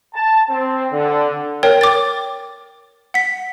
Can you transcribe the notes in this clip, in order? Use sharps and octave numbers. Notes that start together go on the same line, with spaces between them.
A5
C4
D3
A#4 C#5 G5
D6 A6
F#5 B6